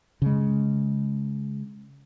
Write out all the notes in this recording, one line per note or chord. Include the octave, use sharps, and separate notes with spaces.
C#3 G#3